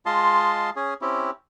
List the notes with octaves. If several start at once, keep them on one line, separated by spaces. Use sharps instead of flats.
G#3 F4 D#5 A5 C6
C#4 G#4
C4 C#4 E4 G4